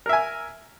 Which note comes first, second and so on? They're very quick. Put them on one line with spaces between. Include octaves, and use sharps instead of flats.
A#4 E5 G#5